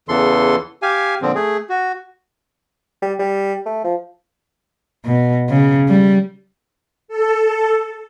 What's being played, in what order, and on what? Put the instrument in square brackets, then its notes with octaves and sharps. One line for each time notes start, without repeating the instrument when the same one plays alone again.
[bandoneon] E2 C#3 E3 A4 C6
G4 F5 G#5
A#2 D3 F3 C4
A3 G#4
F#4
[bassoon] G3
G3
A3
F3
[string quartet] B2
C#3
G3
[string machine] A4